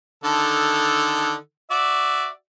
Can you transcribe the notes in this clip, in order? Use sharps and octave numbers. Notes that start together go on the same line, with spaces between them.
D3 D#3 A4
F#4 D5 E5